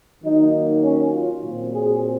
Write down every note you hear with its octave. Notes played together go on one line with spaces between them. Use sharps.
D#3 F#3 A#3 D#4
C#4
F4
A#2 F#3 C4
G#4